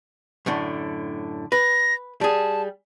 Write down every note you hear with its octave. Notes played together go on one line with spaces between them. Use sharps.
F#2 A2 D3
B4 A#6
G3 G#4 A5